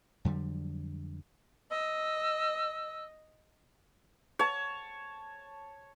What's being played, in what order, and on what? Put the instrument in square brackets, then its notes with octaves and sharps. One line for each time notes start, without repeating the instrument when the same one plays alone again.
[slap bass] F2 D3 F#3 G3
[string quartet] D#5 [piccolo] E6
[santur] C#5 A5